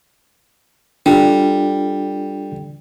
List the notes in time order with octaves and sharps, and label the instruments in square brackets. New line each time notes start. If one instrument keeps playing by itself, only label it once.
[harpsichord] G3 [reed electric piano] D4 F4 A4